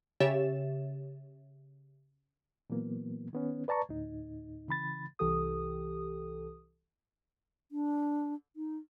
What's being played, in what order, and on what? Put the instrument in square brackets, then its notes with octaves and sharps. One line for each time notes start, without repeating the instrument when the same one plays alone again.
[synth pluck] C#3 G4 C#5 E5 A6 E7
[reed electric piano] A#2 E3 F#3 A#3 B3
D#3 B3 C#4
B4 D5 A5 A#5 C#6
D2 A2 D#4
C#3 E3 B5 A6
[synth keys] C2 E3 G4 A4 D#6
[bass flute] D4
D#4